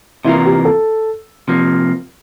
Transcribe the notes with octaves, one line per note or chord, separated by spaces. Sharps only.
C3 E3 A#3 E4 F4 A#4
G4
A4
C3 F3 A#3